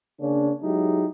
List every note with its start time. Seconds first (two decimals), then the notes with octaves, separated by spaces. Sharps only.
0.20 C#3 A#3 C#4 D4
0.62 F#3 G#3 D#4 E4 G4